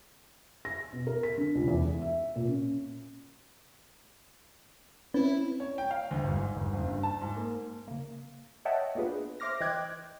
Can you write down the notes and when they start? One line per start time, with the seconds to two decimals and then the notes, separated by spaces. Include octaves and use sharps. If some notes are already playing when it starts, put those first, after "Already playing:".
0.65 A#6
0.93 B2
1.07 A#4
1.23 B6
1.37 D3
1.55 C#2
1.68 E2
1.85 A3
2.02 E5
2.36 A#2
2.48 C#4
5.14 C4 C#4 E4 B4
5.60 C#5
5.78 G5
5.91 F5
6.11 D2
6.24 G1
6.36 G#2
6.56 G1
6.73 F#1
6.87 G2
7.03 A5
7.21 G#2
7.36 A#3
7.88 C#3 A#3
8.65 C#5 D#5 E5 F#5 G5 A5
8.95 A#3 B3 D4 F4 G#4 B4
9.40 C5 E5 C6 D6 F6 A#6
9.61 E3 D#5 G5 D6 F#6 G#6